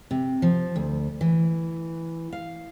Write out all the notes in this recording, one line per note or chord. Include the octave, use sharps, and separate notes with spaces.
C3
F3
D2
E3
F5